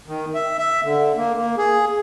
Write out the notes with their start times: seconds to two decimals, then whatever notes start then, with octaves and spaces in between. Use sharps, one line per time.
0.08 D#3
0.35 E5
0.58 E5
0.84 D3
1.17 A#3
1.38 A#3
1.58 G#4